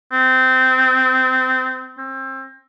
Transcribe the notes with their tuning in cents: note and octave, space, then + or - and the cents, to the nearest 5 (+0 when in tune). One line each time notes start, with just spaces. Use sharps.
C4 -20
C4 +30